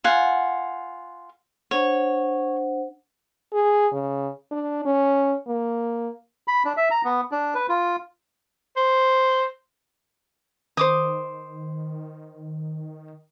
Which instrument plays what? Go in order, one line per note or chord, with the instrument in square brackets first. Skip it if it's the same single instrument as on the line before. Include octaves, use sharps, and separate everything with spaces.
[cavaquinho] F4 F#5 G#5
[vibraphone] D4 C5 F#5 [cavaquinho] C#5
[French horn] G#4
C#3
D4
C#4
A#3
[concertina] B5
D4
E5
A#5
B3
D4
B4
F4
[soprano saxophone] C5
[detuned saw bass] D#3 [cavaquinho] C5 D6 D#6